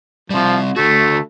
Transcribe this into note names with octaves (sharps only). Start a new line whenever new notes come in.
F3 G3 C4
D3 A3 F#4